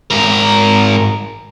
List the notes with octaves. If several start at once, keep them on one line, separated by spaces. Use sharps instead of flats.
G#2 A#4